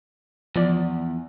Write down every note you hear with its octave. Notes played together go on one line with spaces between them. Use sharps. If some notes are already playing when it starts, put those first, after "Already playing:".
E2 F3 D5